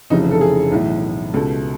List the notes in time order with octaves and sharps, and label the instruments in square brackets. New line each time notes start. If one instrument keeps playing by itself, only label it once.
[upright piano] F1 F2 C#3 E3 D#4
A4
G#4
B1 A2 E3
C#2 B2 A4